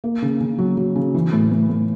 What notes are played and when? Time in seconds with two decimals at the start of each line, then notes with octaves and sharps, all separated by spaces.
0.04 A#3
0.22 C#3
0.41 C#3
0.58 F#3
0.77 F#3
0.96 C#3
1.14 E3
1.33 A2
1.52 A2
1.69 A2